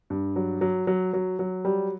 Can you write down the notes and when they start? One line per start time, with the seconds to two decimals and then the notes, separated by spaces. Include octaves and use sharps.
0.10 G2
0.36 F#3
0.61 F#3
0.87 F#3
1.13 F#3
1.39 F#3
1.65 G3